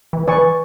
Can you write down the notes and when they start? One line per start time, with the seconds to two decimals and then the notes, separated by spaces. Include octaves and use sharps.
0.13 E3
0.28 E3 B4 D5 G#5 C#6